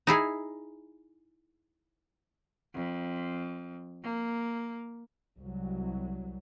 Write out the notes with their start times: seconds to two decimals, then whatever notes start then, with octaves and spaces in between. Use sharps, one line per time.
0.07 D#4 E4 G#4
2.74 F2
4.03 A#3
5.38 C2 F#3